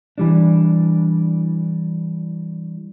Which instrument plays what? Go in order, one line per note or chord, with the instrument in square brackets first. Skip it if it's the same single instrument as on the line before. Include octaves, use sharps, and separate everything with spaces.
[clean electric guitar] E3 G3 D4